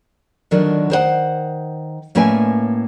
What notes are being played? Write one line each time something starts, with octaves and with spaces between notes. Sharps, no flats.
D3 D#3 F#3 D4 F4 A#4
D#3 C5 C#5 F#5
A2 A#3 C#4 B4 E5 G#5